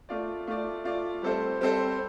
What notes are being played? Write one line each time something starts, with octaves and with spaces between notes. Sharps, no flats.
A3 F4 D5
A3 F4 D5
A3 F4 D5
G3 C4 A4 C5
G3 C4 A4 C5